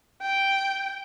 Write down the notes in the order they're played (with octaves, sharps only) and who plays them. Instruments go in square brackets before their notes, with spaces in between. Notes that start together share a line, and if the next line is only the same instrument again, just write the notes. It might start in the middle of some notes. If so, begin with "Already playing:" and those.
[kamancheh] G5